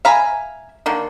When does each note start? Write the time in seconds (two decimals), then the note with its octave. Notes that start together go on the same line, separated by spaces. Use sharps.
0.05 E5 F5 G#5 A#5 B5
0.86 D3 D#3 A#3